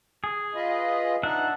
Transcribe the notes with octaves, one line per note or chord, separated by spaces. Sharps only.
G#4
F4 B4 D#5
D4 D#4 E5 F#5